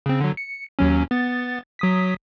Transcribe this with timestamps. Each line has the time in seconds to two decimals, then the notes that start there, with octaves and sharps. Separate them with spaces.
0.06 C#3 C4
0.20 D3 F#3
0.37 C#7
0.79 D#2 F#3 C#4
1.11 B3 A6
1.79 F#3 D#6 B6